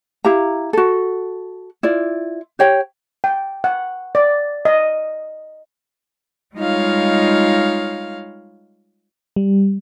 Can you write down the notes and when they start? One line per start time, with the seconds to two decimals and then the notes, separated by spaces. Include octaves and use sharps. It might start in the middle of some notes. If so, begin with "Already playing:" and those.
0.25 E4 G4 F5 A#5
0.73 F#4 A4
1.83 E4 F4 D5
2.59 G4 C#5 G5
3.24 G5
3.64 F#5
4.15 D5
4.65 D#5
6.56 G3 G#3 D#4 F4 C#5 F5
9.36 G3